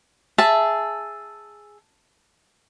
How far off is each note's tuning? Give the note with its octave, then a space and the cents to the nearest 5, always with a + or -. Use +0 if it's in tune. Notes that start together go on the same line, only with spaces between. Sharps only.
G#4 +0 E5 +0 A5 +0